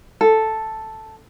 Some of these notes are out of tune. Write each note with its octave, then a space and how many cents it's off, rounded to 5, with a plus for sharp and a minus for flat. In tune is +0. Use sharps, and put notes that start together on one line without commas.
A4 +0